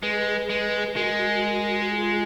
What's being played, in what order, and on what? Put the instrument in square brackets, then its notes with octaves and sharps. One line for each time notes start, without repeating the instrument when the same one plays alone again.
[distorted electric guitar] G#3 [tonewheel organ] G#4 B4
[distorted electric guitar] G#3
[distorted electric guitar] G#3 [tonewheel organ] F#4 A#4
[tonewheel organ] F4 G#4